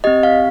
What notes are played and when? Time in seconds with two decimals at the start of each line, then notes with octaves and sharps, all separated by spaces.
0.04 C4 G4 D#5
0.23 F5